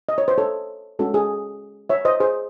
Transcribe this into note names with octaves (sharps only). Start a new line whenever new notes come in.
D#5
C#5
C5
A4 C#5
G#3 C#4 F#4 A4
G#4
C#5 E5
C5 D#5
G#4 C5